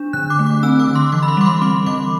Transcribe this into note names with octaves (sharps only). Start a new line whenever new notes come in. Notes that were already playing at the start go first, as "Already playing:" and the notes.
Already playing: D4
D3 F#6
D6
A3
D6
C4 E6
D6
D3
C6
E3 D6
B5
C6
G3 D6
C6
C4 C6
E3 D6